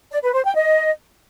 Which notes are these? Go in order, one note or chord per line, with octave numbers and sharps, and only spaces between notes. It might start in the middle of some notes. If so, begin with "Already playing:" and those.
D5
B4
C5
G5
D#5